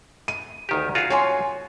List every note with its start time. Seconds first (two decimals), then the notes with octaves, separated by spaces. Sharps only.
0.28 D#7
0.69 D2 D#3 G4
0.95 F4 F#4 G#4
1.10 C#5 G#5 C6